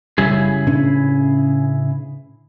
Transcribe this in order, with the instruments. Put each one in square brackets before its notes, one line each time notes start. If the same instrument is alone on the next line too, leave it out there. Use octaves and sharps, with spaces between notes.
[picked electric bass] F#1 C#2 G3 [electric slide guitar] C#3 E4 G#4
[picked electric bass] A2 C#4 D4